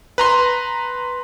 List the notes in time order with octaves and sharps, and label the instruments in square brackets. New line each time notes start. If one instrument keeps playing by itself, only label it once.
[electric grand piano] B4 A#5 C6